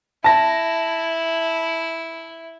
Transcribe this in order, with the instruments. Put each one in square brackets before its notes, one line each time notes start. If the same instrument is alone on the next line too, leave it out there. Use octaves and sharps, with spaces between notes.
[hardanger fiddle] E4 [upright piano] A5 A#6